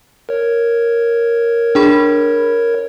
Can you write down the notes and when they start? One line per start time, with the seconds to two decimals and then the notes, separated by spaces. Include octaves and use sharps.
0.29 A#4 C#5
1.75 D4 G#4 B5